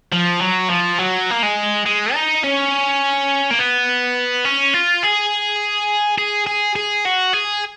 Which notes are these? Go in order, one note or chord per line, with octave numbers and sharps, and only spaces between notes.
F3
F#3
F3
F#3
A#3
G#3
G#3
D#4
C#4
A#3
B3
C#4
F4
G#4
G#4
G#4
G#4
F#4
G#4